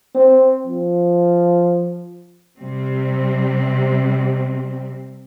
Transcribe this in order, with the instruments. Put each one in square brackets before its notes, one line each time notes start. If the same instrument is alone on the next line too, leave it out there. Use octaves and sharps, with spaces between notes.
[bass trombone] C4
F3
[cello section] C3 G3 C4